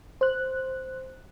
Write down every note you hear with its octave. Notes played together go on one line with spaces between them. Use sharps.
C5 F#6